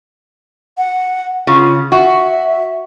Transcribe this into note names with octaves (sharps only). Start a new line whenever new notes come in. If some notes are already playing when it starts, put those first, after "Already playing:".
F#5
C#3 F4
F#4 E5